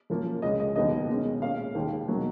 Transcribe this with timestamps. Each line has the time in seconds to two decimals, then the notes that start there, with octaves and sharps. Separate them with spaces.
0.10 F#2 F3 A#3 C#4
0.42 C#2 C#3 G#3 C#4 D#5
0.60 D#5
0.76 D#2 D#3 F#3 B3 D#5
1.09 B2 G#3 C#4
1.42 A#2 G#3 C#4 F5
1.75 D#2 D#3 G#3
2.08 B2 F#3 A#3 D#4